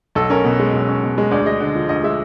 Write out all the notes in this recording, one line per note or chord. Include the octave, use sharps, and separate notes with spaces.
B1 A4
C#4 A#4
B2
G#3
B1
C#4
B2
G#3
D2 D5
G#3 D#5
D3
F3
D2 D#5
G#3 E5